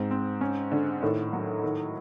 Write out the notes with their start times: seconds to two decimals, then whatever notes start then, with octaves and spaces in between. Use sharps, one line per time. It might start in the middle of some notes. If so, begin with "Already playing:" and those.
Already playing: G#2 C4
0.11 C4
0.41 C#4
0.72 D3
1.02 A2 D#3
1.33 F#3
1.64 D#3